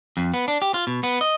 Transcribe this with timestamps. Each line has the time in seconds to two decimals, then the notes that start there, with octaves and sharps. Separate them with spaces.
0.17 F2
0.34 B3
0.48 D4
0.62 G4
0.74 F4
0.87 B2
1.04 B3
1.21 D#5